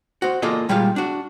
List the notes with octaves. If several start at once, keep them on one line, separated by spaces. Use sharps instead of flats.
F#4 C5
A#3 F4 G#4 A4 D5 D#5
A#2 G3 G#3 F4 G4 F5
D4 F#4